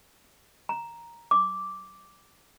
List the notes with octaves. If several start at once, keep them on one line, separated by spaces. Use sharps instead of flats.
A#5
D6